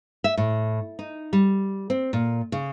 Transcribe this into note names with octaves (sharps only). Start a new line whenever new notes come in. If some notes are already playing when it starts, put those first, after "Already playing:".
E5
A2
D#4
G3
C4
A#2
C#3